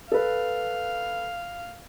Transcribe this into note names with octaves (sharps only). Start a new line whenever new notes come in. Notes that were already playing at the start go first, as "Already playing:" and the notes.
A4 B4 F5